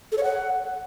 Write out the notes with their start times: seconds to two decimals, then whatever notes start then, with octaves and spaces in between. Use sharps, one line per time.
0.12 A4
0.18 C#5
0.23 F#5